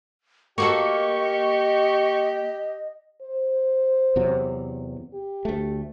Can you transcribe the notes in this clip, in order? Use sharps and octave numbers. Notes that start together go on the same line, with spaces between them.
A#3 F#4 G4 A4 D#5 C#6
C5
E2 C3 F#3
G4
D2 A3